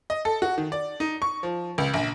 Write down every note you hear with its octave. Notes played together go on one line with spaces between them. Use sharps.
D#5
A4
F#4
D#3
D5
D#4
C#6
F3
C#2
A#1